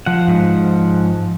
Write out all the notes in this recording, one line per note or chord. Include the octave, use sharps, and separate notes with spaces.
F3 F#5
G#2